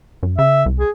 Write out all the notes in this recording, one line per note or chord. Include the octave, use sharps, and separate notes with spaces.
F#2
C#3 E5
C2
G#4